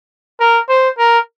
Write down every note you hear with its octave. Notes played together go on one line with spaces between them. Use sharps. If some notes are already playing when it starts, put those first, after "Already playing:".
A#4
C5
A#4